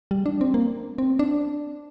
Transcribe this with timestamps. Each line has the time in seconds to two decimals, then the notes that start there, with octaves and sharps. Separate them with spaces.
0.11 G3
0.26 D4
0.41 C4
0.54 A#3
0.98 C4
1.19 D4